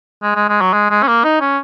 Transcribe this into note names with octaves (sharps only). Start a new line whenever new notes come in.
G#3
G#3
G#3
F#3
G#3
G#3
C#4
A#3
D#4
C#4